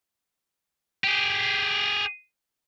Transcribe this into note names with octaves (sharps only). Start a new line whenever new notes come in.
G4 G#4